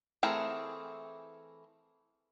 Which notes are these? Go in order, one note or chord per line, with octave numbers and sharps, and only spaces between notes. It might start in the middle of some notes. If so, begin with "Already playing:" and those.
E3 A3 C4 G#4 A#4